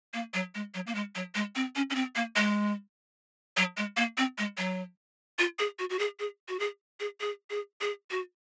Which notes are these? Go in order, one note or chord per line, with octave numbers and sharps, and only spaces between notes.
A#3
F#3
G#3
F#3
A#3
G#3
F#3
G#3
C4
C#4
C#4
C4
A#3
G#3
F#3
G#3
A#3
C4
G#3
F#3
F4
G#4
F#4
F#4
G#4
G#4
F#4
G#4
G#4
G#4
G#4
G#4
F#4